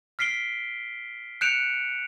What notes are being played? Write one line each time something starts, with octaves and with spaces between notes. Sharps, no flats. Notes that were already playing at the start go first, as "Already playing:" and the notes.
F6 B6 C7 D7 G7
F#6 G6 C#7 D7 E7 F7